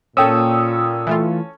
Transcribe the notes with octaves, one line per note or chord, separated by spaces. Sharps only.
A#2 C#4 A4 G5 D#6 E6
E3 A3 F4